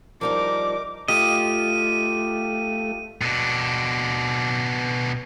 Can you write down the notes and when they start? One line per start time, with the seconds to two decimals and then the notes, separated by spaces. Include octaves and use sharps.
0.21 F3 G3 D#4 A#4 D6
1.08 A3 F4 G4 D#5 D#7
3.21 B2 D4